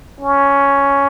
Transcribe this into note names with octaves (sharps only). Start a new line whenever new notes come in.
C#4